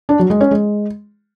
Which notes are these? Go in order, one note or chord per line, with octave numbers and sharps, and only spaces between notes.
D4
F#3
G#3
C#4
G#3